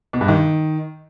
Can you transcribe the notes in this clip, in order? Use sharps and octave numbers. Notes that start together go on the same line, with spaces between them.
B2
G2
D#3